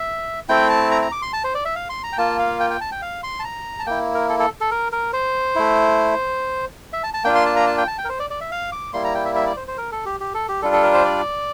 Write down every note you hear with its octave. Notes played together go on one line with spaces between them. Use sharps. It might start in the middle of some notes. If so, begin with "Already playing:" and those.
Already playing: E5
A3 C4 E4 G5
A5
A#5
A#5
D6
C6
A5
C5
D5
E5
F5
C6
A#5
G5
A#3 F4 A5
F5
G5
G5
A5
G5
F5
C6
A5
A#5
A5
A#3 E4 G5
A#4
A4
A4
A4
A#4
A#4
C5
A3 E4
E5
A5
A5
A#3 D4 F4 G5
C6
A5
A#5
A5
G5
A5
G5
A#4
C5
D5
D5
E5
F5
D6
G3 A#3 E4 C6
A#5
G5
E5
E5
D5
C5
C5
A#4
A4
G4
G4
A4
G4
G3 D4 F4 A4
A4
A#4
C5
D5